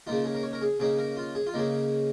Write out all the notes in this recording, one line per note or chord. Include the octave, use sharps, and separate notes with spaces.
C#3 A#3 D#4 F4
G#4
A#4
C#5
A#4
G#4
C#3 A#3 D#4 G#4
A#4
F4
G#4
F4
C#3 A#3 D#4 G#4